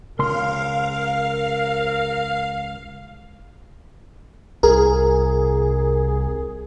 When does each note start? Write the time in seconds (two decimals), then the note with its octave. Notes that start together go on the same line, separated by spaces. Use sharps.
0.19 C#2 A#4 F5 C6
4.63 C2 G#4 A#4